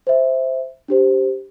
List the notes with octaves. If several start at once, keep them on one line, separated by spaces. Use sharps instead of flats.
C5 E5
D4 G4 C5